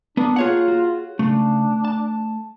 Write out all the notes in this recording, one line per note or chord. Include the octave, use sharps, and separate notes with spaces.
A#3 B3 D4 A#4
F4 G#4 C#5 F#5
F#4
C#3 A3 D4
A5